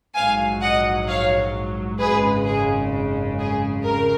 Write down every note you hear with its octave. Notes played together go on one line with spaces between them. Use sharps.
A#1 G#2 F#3 F5 G#5
D#5 F#5
C#5 F5
G#1 F#2 C#3 G#3 G#4 B4
G#4
G#4
F2 C#3 A#4